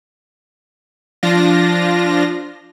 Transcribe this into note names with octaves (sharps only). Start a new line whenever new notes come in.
F3 D4 F4 A#6